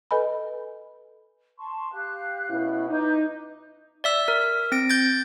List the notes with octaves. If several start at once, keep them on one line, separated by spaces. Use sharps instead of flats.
A4 B4 D#5 G#5 B5
A5 C6 C#6
G4 F5 F#6
B2 C#4 E4
D#4 B4 D6 G6
D5 E5 E6
A#4
C4 A#6 D7
G6 A6